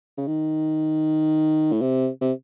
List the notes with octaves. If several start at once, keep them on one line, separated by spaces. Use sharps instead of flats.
C#3
D#3
A2
C3
C3